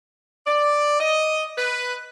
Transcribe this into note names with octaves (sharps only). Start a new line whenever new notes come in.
D5
D#5
B4